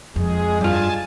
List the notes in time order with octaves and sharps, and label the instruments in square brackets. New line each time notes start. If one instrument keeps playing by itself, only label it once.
[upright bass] F2 [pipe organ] G#3 G#4
[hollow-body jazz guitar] G2 F4 [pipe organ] G#5 A5